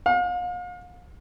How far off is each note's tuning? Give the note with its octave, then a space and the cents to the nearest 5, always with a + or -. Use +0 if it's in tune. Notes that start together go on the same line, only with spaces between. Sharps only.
F5 +40